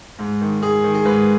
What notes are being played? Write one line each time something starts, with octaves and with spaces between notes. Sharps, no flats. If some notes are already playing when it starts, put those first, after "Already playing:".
G#2
D#3
G#2 G#4
D#3
G#4
G#2 B4